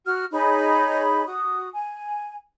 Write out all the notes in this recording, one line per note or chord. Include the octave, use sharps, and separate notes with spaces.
F#4 F6
D#4 G#4 C#5 B5
F#4 D#6
G#5